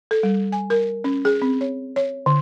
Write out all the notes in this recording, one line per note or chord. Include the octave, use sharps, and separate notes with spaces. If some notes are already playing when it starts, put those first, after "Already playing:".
A4
G3
G#5
A#4
C#4
G#4
C4
C#5
C#5
D3